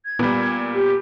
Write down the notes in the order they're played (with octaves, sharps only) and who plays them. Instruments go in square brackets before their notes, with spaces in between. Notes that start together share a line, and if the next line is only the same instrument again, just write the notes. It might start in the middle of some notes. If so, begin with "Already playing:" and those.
[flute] G#6
[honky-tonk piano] A#2 G3 [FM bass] B3
[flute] G4